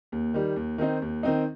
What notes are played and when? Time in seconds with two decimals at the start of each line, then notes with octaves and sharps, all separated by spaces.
0.12 D#2
0.34 D#3 G3
0.56 D#2
0.78 D#3 C4 D#4
1.02 D#2
1.23 D#3 C4 D#4